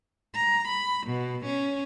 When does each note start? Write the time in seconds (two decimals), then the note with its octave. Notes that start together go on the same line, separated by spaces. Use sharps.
0.35 A#5
0.66 B5
1.05 B2
1.45 C#4